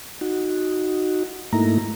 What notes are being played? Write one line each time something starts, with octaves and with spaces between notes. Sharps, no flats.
D#4 F#4
G#2 A3 A#3 D#4 E4 A#5